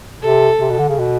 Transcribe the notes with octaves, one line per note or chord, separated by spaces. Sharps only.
C3 A4
C3
B2
D3
C#3
B2